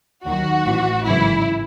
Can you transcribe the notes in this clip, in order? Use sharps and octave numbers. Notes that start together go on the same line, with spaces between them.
D#2 D#3 F#3 F#4
A1 A2 E3
G#1 F#2 C#3 E3 E4